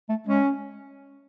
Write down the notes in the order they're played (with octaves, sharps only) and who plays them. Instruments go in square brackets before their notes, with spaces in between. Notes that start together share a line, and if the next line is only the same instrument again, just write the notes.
[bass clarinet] A3
[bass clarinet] G#3 [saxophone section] C#4